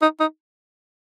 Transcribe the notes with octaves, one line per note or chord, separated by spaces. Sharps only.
D#4
D#4